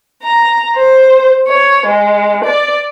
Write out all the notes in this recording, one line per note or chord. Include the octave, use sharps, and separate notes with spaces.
A#5
C5
C#5
G#3
D5